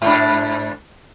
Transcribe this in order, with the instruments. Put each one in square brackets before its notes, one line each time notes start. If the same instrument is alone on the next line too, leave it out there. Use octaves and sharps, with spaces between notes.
[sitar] G#2 D4